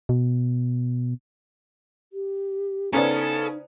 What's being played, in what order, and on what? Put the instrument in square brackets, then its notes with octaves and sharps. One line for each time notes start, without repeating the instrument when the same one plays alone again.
[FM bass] B2
[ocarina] G4
[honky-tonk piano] C#3 B3 C#4 [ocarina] D#4 [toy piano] E4 C5 D5 [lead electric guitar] A4